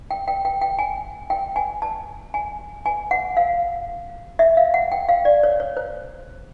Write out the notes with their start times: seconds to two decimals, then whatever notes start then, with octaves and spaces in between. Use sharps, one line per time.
0.11 G5
0.28 G5
0.45 G5
0.61 G5
0.79 G#5
1.30 G5
1.56 G#5
1.82 A5
2.34 G#5
2.86 G#5
3.11 F#5
3.37 F5
4.39 E5
4.57 F5
4.74 F#5
4.92 G5
5.09 F5
5.25 D5
5.43 C#5
5.60 C#5
5.77 C5